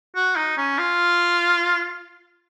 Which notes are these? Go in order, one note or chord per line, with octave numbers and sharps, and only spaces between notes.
F#4
D#4
C#4
F4